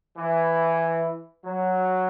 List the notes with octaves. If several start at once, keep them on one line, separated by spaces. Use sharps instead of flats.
E3
F#3